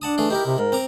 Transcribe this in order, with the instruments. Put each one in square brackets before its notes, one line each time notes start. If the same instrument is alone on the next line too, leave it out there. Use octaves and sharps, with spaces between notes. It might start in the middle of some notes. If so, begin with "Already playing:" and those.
[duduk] D4 [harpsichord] F#5 A5 D#6
[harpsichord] E3 A3 G#4
[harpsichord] D#4 E4 A#4 [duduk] G4
[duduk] C3
[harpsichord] G#2 [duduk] A#4
[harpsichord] C4 A#5 D6